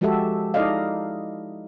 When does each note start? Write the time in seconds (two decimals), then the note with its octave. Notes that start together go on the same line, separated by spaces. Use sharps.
0.01 F3 G#3 F#4 G4 A4 E5
0.54 D#4 E4 A4 D5 D#5 F5